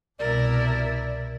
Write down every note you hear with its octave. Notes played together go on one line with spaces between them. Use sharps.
C2 B2 E4 A#4 D5